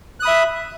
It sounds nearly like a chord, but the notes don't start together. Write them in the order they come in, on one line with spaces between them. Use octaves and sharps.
F#6 D#6 B5 E5